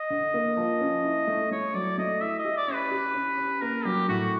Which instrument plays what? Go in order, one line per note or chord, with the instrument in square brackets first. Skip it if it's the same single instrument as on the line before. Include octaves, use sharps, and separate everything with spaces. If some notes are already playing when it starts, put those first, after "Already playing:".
Already playing: [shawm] D#5
[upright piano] D3
A#3
F3
C#4
E4
A3
[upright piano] A3 [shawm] C#5
[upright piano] F#3 [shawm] D5
[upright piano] A3 [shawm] D#5
[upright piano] E4 [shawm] E5
[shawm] D#5
[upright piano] G4
[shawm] D5
[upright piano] C#4
[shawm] B4
[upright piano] G4
C#4
C#4
[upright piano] A#3 [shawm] A#4
[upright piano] F#3 [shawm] G4
[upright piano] A2 [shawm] F#4